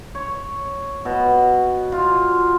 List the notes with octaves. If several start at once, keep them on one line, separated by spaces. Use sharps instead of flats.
C#5
B2
F4